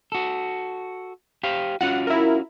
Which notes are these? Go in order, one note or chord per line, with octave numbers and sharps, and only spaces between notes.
F#4 A4
G4 C5 F5
C#4 F4 F#4 F#5
E4 A#4